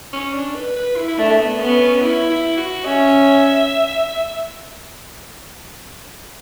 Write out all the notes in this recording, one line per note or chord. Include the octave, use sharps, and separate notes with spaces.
C#4
D4
B4
B4
E4
E4
A3 D4
B3
B3 C#4
C#4
E4
E4
F#4
C#4 E5